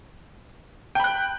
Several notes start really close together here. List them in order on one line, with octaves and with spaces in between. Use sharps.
G5 B5 F#6